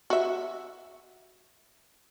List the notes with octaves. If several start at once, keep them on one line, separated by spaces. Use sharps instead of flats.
F#4 E5